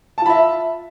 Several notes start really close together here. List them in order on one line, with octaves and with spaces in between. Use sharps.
A5 F4 B5 E5